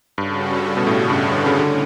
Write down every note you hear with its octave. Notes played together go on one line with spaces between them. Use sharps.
G2 C#3 G3 C#4 F#4 A4
B2
A2
G2
D3
C#3
A2 D3 C#4